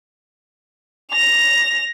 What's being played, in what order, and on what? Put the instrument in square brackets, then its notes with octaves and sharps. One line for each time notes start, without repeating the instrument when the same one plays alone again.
[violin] A#6 F7